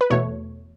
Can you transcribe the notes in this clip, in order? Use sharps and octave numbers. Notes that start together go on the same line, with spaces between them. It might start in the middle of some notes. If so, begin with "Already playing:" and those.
B4
E2 B2 A3 C#5